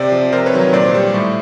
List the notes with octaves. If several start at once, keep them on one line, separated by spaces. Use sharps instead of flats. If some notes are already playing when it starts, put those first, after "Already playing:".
Already playing: C3 C5 D5
F3
C3 A#4 C5
B4 C#5
D#3 F#3
A#2 C5 D5
G3
A2